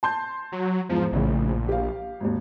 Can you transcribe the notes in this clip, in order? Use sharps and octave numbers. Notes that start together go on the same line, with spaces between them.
A5 C6 G6
F#3
E2 G#2 F3
A#1 A2 C#3
G4 F5
G#1 D#2